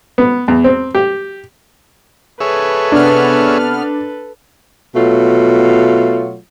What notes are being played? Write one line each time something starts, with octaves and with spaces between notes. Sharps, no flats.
B3
E2
C4
G4
G#4 A4 B4 C#5 E5
C3 B3 D4 F6
B2 F#3 A3 F4